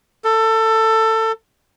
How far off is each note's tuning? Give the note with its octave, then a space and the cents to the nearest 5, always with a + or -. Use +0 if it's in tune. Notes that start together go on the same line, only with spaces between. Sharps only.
A4 +20